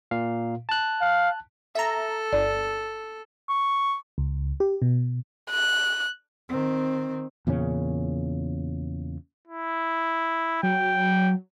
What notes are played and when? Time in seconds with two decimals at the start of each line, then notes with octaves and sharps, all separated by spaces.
0.11 A#2 F5
0.69 A5 F#6
1.01 F5
1.75 A4 E5 A#5
2.33 G1 D5
3.49 C#6
4.18 C#2
4.60 G4
4.82 B2
5.50 F#6
6.49 D#3 C4
7.47 E2 A#2 C#3 C#4
9.48 E4
10.63 F#3 G5